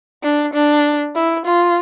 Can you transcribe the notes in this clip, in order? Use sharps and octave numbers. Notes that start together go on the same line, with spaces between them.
D4
D4
E4
F4